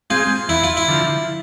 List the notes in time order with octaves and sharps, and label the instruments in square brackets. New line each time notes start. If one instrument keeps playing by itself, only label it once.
[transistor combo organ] G#3 C4 G#4 [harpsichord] F4
[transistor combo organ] E2 [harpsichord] E4
[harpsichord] F4
E4
[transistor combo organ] D3 F3